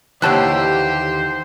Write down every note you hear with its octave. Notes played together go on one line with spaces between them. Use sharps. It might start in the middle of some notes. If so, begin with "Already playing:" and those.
D#2 D3 E3 G4 C5 C#5 A5 F#6